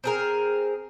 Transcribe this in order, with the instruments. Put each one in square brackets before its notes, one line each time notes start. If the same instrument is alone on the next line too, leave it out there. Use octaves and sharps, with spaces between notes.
[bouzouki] C4 G#4 A#4